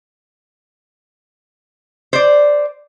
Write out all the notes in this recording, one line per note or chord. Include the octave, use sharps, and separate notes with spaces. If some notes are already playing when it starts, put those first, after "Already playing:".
C5 D5